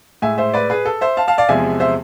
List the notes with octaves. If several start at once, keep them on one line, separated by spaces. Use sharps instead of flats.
A2 G#3 E5 G#5
C5 E5
B4 D5
G#4 B4
A4
C5 E5
F5 A5
F5 A5
D5 F5
E2 C3 F3 G#3 E5 G#5
C5 E5